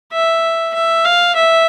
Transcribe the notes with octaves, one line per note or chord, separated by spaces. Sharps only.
E5
E5
F5
E5